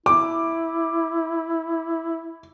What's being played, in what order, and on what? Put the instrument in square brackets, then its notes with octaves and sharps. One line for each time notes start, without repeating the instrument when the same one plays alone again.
[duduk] E4 [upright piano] D6